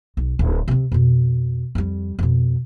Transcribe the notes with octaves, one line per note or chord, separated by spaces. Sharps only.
B1
D1
C3 C4
F2 B2
F2 G3
F2 B2